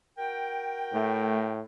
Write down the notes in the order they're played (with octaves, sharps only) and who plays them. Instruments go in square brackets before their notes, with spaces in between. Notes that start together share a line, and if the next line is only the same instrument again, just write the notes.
[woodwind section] F#4 A#4 G5
[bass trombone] A2 [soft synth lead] A3